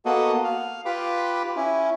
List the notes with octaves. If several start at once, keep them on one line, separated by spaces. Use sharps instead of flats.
A#3 B3 F#4 A4 D#5
F5
F4 G4 B4 B5 D6
C#4 E4